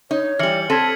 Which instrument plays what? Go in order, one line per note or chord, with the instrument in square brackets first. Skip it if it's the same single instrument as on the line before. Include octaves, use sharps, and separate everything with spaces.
[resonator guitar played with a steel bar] D#4 [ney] C#5
[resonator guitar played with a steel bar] E3 G3 [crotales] F6 C#7 F#7
[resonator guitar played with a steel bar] C4 A4 [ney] A5 [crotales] G#6 B6 D#7